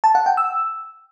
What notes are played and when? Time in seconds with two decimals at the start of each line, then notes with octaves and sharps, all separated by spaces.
0.04 A5
0.15 F#5
0.26 G5
0.37 E6